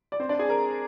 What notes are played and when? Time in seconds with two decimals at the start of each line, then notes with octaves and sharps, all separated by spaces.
0.12 D5
0.20 C4 C5
0.29 D4 D5
0.39 G#4 G#5
0.49 A#4 A#5